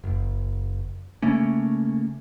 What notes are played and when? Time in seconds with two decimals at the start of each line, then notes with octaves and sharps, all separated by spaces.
0.04 F#1
1.22 C#3 A3 A#3 C#4